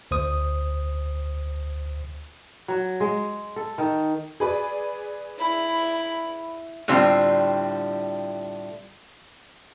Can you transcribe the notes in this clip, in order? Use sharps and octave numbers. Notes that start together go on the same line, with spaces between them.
D2 C5 D#6
F#3
G#3
A4
D#3
G#4 B4 D5
E4 B5
A2 D3 G3 C4 F4